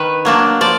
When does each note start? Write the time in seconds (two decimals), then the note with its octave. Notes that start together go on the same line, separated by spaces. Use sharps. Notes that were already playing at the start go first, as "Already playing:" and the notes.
Already playing: D#3 B4
0.25 F#3 A#3 D4
0.61 F3 D5